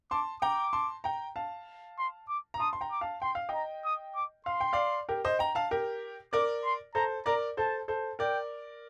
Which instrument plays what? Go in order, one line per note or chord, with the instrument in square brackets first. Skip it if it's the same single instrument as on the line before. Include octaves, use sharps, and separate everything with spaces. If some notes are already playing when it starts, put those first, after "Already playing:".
[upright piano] A5 C6 [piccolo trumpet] D6
[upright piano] G5 A#5 [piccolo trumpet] D6
[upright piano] A5 C6
G5 A#5
F5 A5
[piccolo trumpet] C6
D6
[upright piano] A#5
[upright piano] A5 C6 [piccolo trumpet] D#6
[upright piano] C6
G5 A#5
[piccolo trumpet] D6
[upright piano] F5 A5
[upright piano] G5 [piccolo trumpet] C6
[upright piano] F5
[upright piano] D#5 G5 [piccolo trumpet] A#5
[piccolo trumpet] D#6
D6
[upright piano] F5 [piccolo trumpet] C6
[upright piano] G5
D5 F5
G4 A#4
C5 D#5
G5 A#5
F5 A5
G4 A#4
[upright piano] A#4 D5 [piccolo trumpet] D6
[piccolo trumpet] C6
[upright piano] A4 C5 [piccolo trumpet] A#5
[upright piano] A#4 D5 [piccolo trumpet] A#5
[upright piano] A4 C5 [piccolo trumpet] A5
[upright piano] A4 C5
[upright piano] A#4 D5 [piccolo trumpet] G5